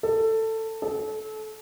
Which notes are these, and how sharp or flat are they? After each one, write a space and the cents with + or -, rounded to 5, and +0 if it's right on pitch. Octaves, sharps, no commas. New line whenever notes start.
A4 +15
A4 -30